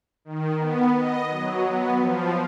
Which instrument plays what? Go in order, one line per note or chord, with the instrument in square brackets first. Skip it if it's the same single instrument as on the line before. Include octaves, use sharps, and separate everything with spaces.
[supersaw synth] D#3
B3
D#5
F#3
B3
F3